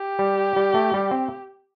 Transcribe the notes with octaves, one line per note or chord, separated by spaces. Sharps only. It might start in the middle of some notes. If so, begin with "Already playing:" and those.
Already playing: G4
G3
G3
A3
G3
C4